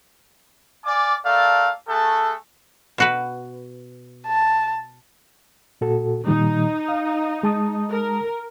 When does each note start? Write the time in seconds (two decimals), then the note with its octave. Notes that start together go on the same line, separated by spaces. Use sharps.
0.85 D5 F5 G#5 D6
1.25 A3 A4 A#4 D5 F5
1.88 A3 F#4 G#4 A4
2.98 B2 F#4 B4
4.27 A5
5.81 A#2 F#4 A4
6.27 A#2 D#3 G3 D#4
6.88 F5
7.43 G#3 A5 D#6
7.90 A#4